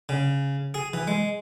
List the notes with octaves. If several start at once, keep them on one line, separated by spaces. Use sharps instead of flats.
C#3
G#4
E3
G#3